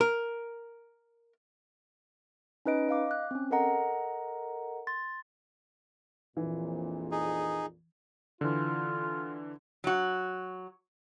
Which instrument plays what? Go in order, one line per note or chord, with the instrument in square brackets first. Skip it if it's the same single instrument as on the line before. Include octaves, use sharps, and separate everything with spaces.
[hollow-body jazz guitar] A#4
[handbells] C#4 D#4 B4 D#5 D7
D#5 F5 D6
D6 F#6
C4 C#4
A4 A#4 D#5 F#5 A#5
C6 A6
[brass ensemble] A#1 F2 A#2 [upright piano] E3
[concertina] D#4 G#4
[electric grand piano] D3 E3 [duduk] F4
[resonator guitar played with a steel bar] F#3 F#4